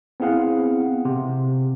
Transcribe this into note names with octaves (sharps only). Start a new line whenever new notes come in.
B3 C4 E4 G#4 F5 F#5
C3